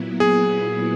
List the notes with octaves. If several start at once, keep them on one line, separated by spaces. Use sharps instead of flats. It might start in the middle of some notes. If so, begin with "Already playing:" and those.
Already playing: A#2 F#3 B3 E4
G#4